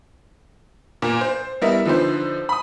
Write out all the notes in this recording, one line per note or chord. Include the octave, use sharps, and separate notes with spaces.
A#2
C5
G3 B3 E4 A#4 D#5 E5
D3 F3 D#4 B4 C5
B5 D#6